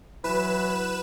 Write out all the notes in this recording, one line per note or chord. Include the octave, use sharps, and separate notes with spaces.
E3 F#3 B4 E7